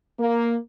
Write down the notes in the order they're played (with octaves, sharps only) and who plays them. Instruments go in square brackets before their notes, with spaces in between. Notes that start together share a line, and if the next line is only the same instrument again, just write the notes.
[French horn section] A#3